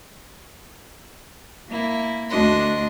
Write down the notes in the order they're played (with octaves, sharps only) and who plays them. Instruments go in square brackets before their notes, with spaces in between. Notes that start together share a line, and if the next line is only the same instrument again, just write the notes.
[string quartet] A#3 E4
D2 A3 D4 F#4 D#5 C6